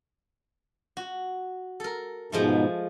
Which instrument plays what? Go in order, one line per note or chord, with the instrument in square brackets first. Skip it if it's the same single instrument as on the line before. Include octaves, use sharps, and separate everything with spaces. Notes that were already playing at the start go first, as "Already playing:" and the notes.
[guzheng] F#4
A4 A#4
[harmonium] G#2 B2 [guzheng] F3 G#3 A3